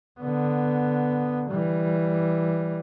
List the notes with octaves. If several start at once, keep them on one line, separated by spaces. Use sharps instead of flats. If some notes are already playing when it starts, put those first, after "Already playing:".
D3 B3
E3 G3